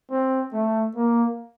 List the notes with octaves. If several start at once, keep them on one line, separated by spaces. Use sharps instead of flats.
C4
A3
A#3